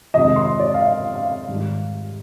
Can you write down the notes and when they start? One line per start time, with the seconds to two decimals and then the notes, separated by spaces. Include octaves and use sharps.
0.14 F2 C3 D#3 G#3 D#5
0.36 C6
0.60 D5
0.74 F5
0.81 D#5
1.15 F5
1.48 G#2 D#3 G3